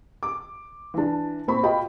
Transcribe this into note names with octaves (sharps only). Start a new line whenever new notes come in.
D6
E3 D4
A#2 C4 B5 C#6
F4 F#4 D#5 G5 B5